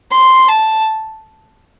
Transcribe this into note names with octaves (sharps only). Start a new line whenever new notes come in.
C6
A5